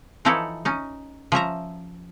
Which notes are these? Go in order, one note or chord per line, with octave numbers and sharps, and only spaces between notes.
E3 F3 D#4 E4 A4 C#5
C#4 D#4
F3 C#4 E5 A#5